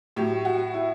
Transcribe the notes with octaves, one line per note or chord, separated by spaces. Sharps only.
A2 F#3 G4
F#4
E4